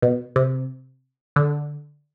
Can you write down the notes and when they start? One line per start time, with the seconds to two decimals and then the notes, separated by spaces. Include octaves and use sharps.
0.02 B2
0.36 C3
1.36 D3